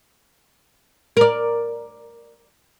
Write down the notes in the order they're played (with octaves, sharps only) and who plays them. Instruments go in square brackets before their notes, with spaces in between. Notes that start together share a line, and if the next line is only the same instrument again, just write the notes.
[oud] A#4 D5